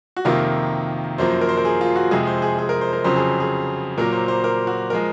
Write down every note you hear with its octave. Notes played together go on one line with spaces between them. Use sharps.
F#4
F2 C3 D#3 A#3 F4
F#2 F3 A#3 C5
A#4
C5
A#4
G#4
F4
F#4
F2 C3 F3 G#3 G#4
C5
G#4
G#4
A#4
C5
A#4
F2 C#3 F#3 C5
G#4
G#4
A#2 F#3 A#3 A#4
C5
C5
A#4
F#4
F3 G#3 A#4